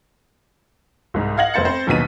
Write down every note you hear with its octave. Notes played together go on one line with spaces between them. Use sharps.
C2 G#2
D#5 F5 F#5 G#6 A#6 F#7
F1 B3 C5 A6 C#7
C4 C5
A#1 D#2 B2 F#3 B6 D#7